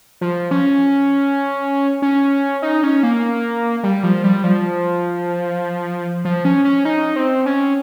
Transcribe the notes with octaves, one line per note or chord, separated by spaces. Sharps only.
F3
C#4
C#4
D#4
C#4
A#3
G3
F3
G3
F3
F3
C#4
C#4
D#4
C4
C#4